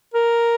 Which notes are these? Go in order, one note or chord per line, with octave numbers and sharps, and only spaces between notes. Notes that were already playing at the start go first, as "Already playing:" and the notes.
A#4